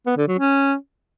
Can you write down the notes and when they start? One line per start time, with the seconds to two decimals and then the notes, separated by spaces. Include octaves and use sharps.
0.06 B3
0.17 D3
0.28 F#3
0.39 C#4